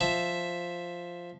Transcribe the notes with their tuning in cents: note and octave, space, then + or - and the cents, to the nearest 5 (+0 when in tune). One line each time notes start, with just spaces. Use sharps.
F3 +0 E5 +0